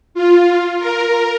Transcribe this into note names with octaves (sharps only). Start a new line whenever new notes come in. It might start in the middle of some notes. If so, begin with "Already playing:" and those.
F4
A#4